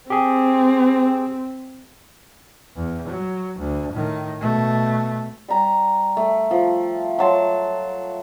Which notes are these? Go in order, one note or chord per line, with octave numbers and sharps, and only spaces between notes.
C4 G4 G#4
E2
F#3
D2
A2 D#3
B2 A3
G3 A#5
A3
F3
F#3 A5 C6